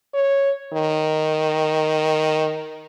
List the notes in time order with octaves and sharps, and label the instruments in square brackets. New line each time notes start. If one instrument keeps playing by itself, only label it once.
[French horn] C#5
D#3